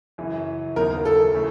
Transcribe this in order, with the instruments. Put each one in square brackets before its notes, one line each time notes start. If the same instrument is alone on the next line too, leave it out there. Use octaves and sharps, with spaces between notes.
[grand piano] F#2 C#3 E3
[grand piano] D#2 C#3 F#3 B3 D#4 [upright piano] A#4
[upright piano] A4
[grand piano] C#3 E3 A3